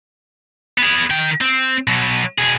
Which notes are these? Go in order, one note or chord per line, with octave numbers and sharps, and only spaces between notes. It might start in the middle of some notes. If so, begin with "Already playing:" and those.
B3 G#4
D#3 G5
C4
B2 F#3
B2 G#4